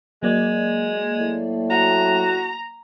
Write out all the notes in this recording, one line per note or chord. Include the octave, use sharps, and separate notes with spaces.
F#3 G#3 A#3 D5
A2
F#4 A#5